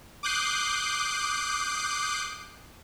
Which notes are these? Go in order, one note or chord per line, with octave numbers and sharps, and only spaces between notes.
D6 D#6 F#6 G6 C7